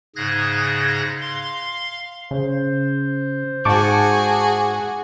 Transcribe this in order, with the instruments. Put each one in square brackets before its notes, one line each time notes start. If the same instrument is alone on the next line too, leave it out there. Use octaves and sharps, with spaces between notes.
[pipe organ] G#2 C#3 G#4 F#6 G#6 A#6
F5 C6
[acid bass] C#3 [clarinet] C5
[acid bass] G#2 [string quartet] F#4 G#4 [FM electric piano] A5 C#6 D6